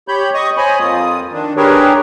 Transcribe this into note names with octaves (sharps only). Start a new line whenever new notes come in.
G4 C#5 B5 G6
D#5 C#6 D#6
C5 C#5 D#5 G#5 B5
F2 A#3 F4 D#6
D#3 D4
D4 G4 G#4 A#4 B4 C#5